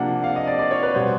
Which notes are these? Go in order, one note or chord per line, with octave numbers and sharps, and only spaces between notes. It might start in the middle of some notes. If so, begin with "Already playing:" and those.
Already playing: C3 F3 A#3 D4 F#5
F5
D#5
D5
D5
C#5
B4
B2 G3 B3 C5